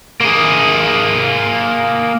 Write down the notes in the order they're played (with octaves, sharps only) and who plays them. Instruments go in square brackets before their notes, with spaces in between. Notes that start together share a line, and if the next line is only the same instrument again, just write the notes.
[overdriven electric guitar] A#3 G#4